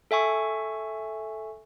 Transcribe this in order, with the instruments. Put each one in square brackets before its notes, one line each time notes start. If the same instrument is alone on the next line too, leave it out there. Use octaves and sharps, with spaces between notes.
[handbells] A4 E5 G#5 C#6